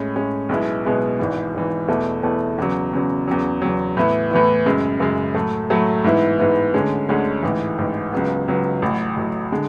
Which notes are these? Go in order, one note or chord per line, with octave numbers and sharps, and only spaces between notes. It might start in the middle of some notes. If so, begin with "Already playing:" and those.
Already playing: A2 G#3 C#4
A2 G#3 C#4
B1 B2 G#3 B3 E4
B1 B2 G#3 B3 E4
G#1 G#2 E3
G#1 G#2 E3
E2 B2 A3 E4
E2 B2 A3 E4
E2 C#3 F#3
E2 C#3 F#3
E2 C#3 F#3
E2 C#3 F#3
A2 E3 B3 E4
A2 E3 B3 E4
F#2 C#3 G#3
F#2 C#3 G#3
A2 F#3 A3
A2 F#3 A3
G#2 E3 B3 E4
G#2 E3 B3 E4
D2 D3 G#3 C#4
D2 D3 G#3 C#4
A1 G#2 E3
A1 G#2 E3
C#2 C#3 F#3 B3
C#2 C#3 F#3 B3
A1 A2 F#3
A1 A2 F#3
D3 G#3